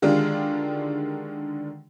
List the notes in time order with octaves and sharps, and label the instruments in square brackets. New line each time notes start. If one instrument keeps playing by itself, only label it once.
[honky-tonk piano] D3 D#3 G#3 D4 F4 G4